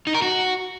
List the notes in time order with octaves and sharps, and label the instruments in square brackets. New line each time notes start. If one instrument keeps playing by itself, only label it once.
[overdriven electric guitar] D#4
A#4
F#4